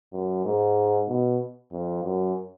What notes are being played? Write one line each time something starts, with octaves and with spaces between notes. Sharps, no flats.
F#2
G#2
B2
F2
F#2